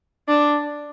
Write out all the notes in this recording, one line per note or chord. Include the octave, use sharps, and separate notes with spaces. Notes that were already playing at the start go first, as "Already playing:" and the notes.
D4